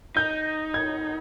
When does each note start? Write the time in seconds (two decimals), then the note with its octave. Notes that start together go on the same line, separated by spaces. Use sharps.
0.16 D#4 G6
0.74 G#6